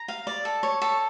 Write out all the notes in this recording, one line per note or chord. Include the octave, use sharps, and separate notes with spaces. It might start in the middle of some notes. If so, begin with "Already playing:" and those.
Already playing: A#5
F5
D5
A4
C#5
A4